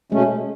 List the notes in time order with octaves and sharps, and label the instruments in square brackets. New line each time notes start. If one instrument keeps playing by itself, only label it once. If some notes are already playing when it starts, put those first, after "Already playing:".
[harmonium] B2 A3 C#4 [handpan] G#3